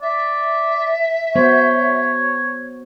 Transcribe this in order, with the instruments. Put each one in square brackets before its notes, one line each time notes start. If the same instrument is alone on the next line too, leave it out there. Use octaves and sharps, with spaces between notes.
[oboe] D5 [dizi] E5
[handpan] F#3 B3 C5 [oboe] C#5